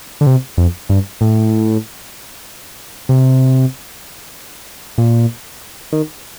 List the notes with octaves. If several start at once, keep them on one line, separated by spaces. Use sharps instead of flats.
D3
C3
F2
G2
A2
C3
A#2
D#3